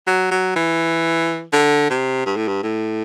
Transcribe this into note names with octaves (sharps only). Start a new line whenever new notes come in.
F#3
F#3
E3
D3
C3
G2
A2
G2
A2